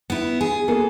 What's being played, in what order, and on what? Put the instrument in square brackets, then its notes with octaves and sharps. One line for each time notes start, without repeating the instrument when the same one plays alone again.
[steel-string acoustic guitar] B3 E4
G#4
[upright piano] A#3 G#4 [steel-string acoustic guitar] A4